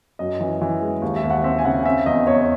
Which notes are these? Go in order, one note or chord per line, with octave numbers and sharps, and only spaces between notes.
F#2 D#5
E3
E3
G#3
D#2
E5
D#2
F#5
C4 E5
G#5
C#3 F#5
C4 E5
E2 D#5
E2 C#5